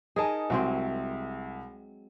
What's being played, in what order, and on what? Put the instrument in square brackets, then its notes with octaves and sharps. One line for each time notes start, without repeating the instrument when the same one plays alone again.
[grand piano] D#4 G#5 A5 [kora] G#4 A#4 D#5
[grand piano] C2 [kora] F#3 G#3 C4